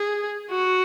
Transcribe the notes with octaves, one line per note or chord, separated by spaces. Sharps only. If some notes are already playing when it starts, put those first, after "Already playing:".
Already playing: G#4
F#4